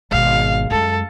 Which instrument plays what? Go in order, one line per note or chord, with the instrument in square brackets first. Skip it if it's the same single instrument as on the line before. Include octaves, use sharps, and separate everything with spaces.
[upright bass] G#1 B2 [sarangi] F5
[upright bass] F#2 G#3 [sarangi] A4